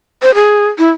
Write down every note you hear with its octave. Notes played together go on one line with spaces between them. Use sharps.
C5
G#4
E4